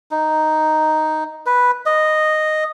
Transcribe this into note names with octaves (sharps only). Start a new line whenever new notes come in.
D#4
B4
D#5